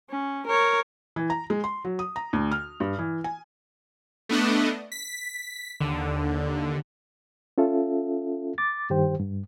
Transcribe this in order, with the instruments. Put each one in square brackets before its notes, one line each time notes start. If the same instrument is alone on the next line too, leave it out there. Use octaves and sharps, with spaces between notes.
[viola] C#4
A#4 C#5
[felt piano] E3
A#5
G#3
C6
F#3
D#6
A#5
D2
F6
G2
E3
G#5
[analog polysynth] A3 B3 D4 D#5
B6
D#2 D3
[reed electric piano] C#4 F4 A4 E5
D6 A6
G2 D#3 G4 C5 G5
G2